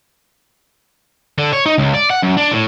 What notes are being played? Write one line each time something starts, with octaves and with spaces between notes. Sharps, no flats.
D3
C#5
D#4
C#2
D5
F#5
F#2
D4
A2